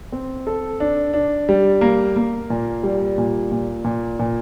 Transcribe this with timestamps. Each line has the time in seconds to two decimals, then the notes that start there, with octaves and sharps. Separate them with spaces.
0.12 C4
0.47 A4
0.80 D4
1.14 D4
1.49 G3
1.81 A#3
2.16 A#3
2.50 A#2
2.83 G3
3.18 A#2
3.52 A#2
3.84 A#2
4.19 A#2